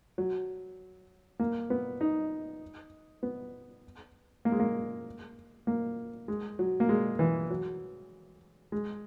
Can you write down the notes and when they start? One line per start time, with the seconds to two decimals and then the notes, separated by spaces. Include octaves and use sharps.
0.18 F#3
1.39 A#3
1.70 B3
2.01 D#4
3.23 B3
4.45 A#3
4.52 G#3
4.60 A#3
5.67 A#3
6.28 G#3
6.59 F#3
6.80 A#3
6.89 G#3
7.19 E3
7.50 F#3
8.72 G#3